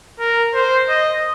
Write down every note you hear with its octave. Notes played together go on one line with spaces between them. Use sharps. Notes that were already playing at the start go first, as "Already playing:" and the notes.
A#4
C5
D#5